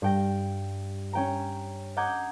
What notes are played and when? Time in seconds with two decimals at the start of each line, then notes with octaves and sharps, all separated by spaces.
0.02 G2 G5 A#6
1.13 C#4 G5 A#5
1.96 D#5 F#5 A#5 D6 G6 G#6